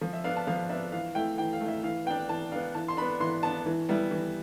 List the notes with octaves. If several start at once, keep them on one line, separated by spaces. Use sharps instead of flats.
F3
E5
B3 D4 F5
A5
F3 F5
B3 D4 E5
E3 F5
A3 E4 G5
E3 G5
F5
A3
E4 E5
E3 F5
B3 D4 G5
E3 A5
B3 D4 F5
E3 A5
C6
B3 D4 B5
E3 C6
B3 D4 A5
E3
G3 B3 E4
E3